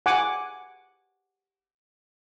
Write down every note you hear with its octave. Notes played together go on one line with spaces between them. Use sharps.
F#5 G#5 D6